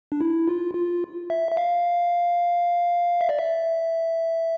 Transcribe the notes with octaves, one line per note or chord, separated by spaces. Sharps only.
D4
E4
F4
F4
E5
E5
F5
E5
D5
E5